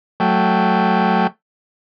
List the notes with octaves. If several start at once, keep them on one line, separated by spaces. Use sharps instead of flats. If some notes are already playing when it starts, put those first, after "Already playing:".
F#3 A3 G5